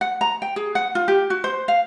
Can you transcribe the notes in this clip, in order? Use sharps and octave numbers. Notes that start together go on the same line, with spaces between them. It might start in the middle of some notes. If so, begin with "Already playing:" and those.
F#5
A#5
G5
G#4
F#5
F4
G4
F#4
C5
F5